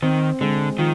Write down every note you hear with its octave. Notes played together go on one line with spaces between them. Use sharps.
D#3 C4
D3 G#3
D#3 F3